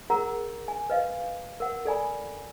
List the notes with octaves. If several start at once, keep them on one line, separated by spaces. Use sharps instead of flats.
G#4 A#4 F#5 A#5
G#5
B4 D#5 F5
A#4 F#5
A4 D5 G#5 B5